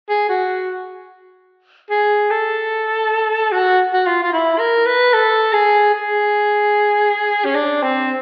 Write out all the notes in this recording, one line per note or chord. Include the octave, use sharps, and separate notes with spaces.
G#4
F#4
G#4
A4
F#4
F#4
F4
F4
E4
A#4
B4
A4
G#4
G#4
C#4
D4
C4